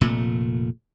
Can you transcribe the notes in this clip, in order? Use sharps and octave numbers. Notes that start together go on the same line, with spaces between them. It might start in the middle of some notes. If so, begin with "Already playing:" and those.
F1 A#2 A3